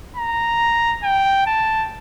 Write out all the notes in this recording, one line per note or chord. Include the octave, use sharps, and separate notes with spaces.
A#5
G5
A5